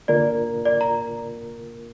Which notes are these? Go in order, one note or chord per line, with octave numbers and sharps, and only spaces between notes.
D3 A#3 F4 A#4 D5
D5
A#5